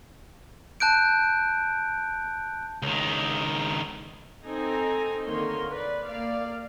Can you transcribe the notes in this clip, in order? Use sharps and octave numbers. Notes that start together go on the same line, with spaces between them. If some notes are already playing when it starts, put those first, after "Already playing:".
A5 F#6 G6 D7
C#2 D#3
C4 D#4 A4 G#5 A#5
D3 D#3 A#3 A#4 C#5 C6
B4 D5
A#3 D5 F5